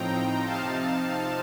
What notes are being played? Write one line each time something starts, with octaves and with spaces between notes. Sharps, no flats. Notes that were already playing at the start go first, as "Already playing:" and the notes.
Already playing: A2 F3 C4 D#4 G5 A#5
C3 F3 C4 D#4 F5 A5